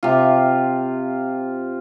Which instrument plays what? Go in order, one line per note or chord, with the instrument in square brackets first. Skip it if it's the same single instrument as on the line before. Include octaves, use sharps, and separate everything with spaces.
[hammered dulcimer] C3 F4